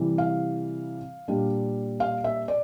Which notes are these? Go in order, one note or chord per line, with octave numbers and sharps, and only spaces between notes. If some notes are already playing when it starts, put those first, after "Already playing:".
Already playing: C3 E3 G3
F5
A#2 G3 D4
F5
E5
D5